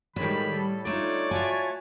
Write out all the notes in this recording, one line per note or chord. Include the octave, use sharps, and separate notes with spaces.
A2 D#3 G3 G#3 B5
G3 A4
D3 A3 D#4 F4 C#5 D5
F4 F#4 E5 G#5 A5